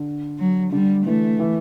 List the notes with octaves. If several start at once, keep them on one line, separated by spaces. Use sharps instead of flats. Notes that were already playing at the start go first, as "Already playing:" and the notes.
Already playing: D3
F#3
D3 G3
E3 A3
E3